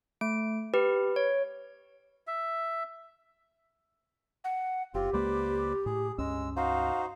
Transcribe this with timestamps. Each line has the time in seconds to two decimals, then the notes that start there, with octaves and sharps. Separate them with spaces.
0.21 A3 D7
0.74 G4 B4
1.16 C#5
2.27 E5
4.44 F#5
4.94 F#1 C4 F4 G4
5.13 C#2 G#3 A#3 B4 C5 D5
5.86 A2 G#4
6.18 C#2 G2 G#3 C#4 E6
6.57 D#4 F#4 C5 F5